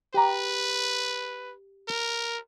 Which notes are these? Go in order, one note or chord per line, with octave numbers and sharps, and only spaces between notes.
G4 B4 A#5
A#4